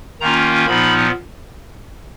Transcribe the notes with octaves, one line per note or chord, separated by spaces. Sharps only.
D#3 A#3 C#4 F4 A#5
A#2 F3 B3 D#4 B5